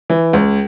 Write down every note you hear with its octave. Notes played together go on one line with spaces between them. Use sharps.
E3
C#2